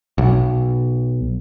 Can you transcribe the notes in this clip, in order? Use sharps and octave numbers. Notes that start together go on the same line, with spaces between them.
B1